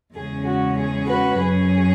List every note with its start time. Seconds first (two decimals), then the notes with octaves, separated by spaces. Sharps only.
0.14 E2 C#3 G#3 C#4 G#4
0.46 F#4
0.77 G#4
1.08 F#4 B4
1.39 F#2 F#3 C#4 G#4